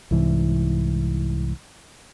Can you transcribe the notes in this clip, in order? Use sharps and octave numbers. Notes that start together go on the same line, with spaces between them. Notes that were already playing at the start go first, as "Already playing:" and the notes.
C2 G#2 E3